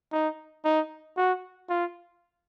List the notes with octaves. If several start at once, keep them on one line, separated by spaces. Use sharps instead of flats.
D#4
D#4
F#4
F4